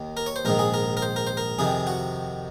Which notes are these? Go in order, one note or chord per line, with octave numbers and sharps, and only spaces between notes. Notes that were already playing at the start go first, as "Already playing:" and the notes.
Already playing: D#2 D#3
A#4
C#5
C5
A#1 G#2 D#3 A#4
G#4
A#4
A#4
C5
A#4
C5
A#4
F2 C3 D#3 G#4
F#4